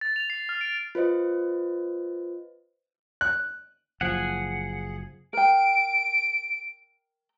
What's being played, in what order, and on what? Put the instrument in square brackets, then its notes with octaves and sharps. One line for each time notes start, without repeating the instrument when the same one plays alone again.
[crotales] A6
F7
C7
F6
D7
[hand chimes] F4 B4 C5 D#5
[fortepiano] F#6
[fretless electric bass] F#1 F3 [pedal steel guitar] G#4 F#5
[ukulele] A#4 G5 [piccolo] D7